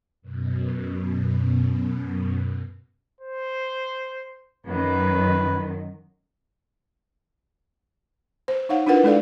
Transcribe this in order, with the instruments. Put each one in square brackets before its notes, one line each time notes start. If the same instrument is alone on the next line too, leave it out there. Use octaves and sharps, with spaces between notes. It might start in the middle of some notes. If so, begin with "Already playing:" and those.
[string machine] F#2 B2
[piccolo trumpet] C5
[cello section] F#2 D#3 [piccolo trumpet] B4
[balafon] C5
D#4 C#5 F5 F#5
D4 E4 F4 A#4 B4 F#5
G#3 D4 A4 D5 F5